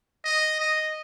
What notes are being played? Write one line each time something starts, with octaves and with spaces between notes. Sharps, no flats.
D#5
D#5